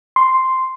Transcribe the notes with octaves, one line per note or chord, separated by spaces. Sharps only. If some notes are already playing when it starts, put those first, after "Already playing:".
C6